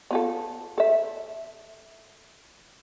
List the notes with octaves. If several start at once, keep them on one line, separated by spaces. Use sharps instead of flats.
B3 F4 A4
A4 E5